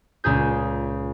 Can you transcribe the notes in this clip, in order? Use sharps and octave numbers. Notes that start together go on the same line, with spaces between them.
C#2 A#2 G#4 G6